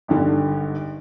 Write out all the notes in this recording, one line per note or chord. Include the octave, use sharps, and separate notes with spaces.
G#1 G2 D3